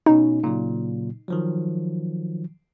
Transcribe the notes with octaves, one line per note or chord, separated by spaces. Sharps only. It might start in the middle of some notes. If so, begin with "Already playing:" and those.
B2 C#4 D#4
A#2 C#3 F#3
D#3 F3 F#3